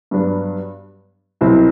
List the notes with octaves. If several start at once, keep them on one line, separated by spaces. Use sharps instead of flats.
G2 F#3 B3 D4
C2 B2 F#3 C4 E4